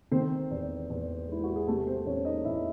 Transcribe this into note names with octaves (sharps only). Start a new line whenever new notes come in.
D#3 C4 C5
E2
E2
G#3 E4
F#4
G#4
C3 A3 A4
C4 C5
E2 C#4 C#5
D#4 D#5
E2 E4 E5